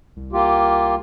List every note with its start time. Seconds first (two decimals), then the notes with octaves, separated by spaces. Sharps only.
0.16 C2
0.33 A#3 F4 G4